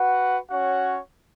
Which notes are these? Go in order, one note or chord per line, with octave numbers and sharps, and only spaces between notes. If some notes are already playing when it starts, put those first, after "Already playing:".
Already playing: F#4 B4 F#5
C#4 F#4 C#5 F#5